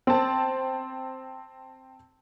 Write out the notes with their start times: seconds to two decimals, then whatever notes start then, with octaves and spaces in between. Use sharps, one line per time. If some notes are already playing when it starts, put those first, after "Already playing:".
0.07 C4 A5